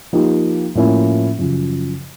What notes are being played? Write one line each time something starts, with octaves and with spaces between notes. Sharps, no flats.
F3 A#3 D#4 G4
A2 F3 A#3 C#4 E4
F#2 C#3 F3